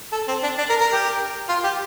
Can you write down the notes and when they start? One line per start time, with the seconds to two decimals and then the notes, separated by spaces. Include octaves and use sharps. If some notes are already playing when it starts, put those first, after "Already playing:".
0.12 A4
0.28 C4
0.43 D4
0.58 D4
0.69 A#4
0.81 A#4
0.92 G4
1.49 F4
1.64 G4